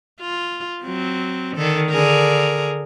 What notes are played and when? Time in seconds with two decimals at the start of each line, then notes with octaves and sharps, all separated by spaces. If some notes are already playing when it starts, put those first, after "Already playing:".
0.21 F4
0.83 F#3 C4
1.57 D3 D#3 A4
1.90 D3 G#4 A#4